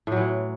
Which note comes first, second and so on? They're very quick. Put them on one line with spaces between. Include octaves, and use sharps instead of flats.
A2 F#3 E3